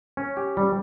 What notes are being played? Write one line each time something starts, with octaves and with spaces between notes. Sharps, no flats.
C#4
G4
G3